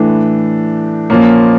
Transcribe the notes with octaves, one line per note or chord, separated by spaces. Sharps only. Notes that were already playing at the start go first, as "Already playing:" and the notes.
Already playing: A2 E3 A3 D4
A#2 F3 A#3 C#4